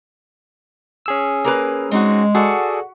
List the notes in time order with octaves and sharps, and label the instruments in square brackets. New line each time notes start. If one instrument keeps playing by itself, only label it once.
[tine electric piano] C#4 G#4 E6
[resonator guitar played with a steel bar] A#3 A#4 B4
[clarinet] G#3 [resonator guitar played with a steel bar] C4 D#4 F#4
[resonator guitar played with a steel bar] F#4 [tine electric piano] G#4 A4 D5